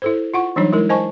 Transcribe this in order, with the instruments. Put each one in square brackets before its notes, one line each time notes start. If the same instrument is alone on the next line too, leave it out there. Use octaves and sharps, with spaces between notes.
[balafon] E4 A4 C5
F4 F#5 C#6
E3 F#3 G3 D4 D#4 C#5
G#3 E4 A#4
C5 D#5 G#5 A5 C#6